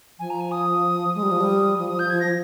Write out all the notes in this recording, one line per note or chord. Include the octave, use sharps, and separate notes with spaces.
F3 G#5
A#5
G#5
D#6
G#3 D#6
G3
F3
G3
F3 D#6
D#6
F3
G6
F3 G#6
A#6
F3